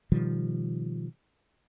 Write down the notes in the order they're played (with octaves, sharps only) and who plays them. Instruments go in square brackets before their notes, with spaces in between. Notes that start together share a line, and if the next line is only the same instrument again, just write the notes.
[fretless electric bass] B2 D#3 F3 G3